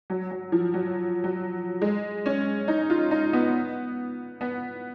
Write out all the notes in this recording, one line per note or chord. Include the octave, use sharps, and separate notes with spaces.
F#3
F#3
F3
F#3
F#3
G#3
C#4
D#4
F4
D#4
B3
B3